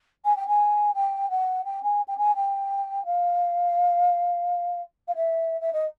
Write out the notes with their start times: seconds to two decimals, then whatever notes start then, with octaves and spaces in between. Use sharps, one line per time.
0.25 G#5
0.36 G5
0.47 G#5
0.94 G5
1.30 F#5
1.64 G5
1.83 G#5
2.08 G5
2.17 G#5
2.35 G5
3.05 F5
5.08 F5
5.15 E5
5.60 E5
5.72 D#5